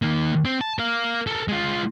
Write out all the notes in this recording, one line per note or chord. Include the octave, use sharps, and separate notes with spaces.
D#3 A#3
C4
A5
A#4 F5
A4 A#4
G#3 F4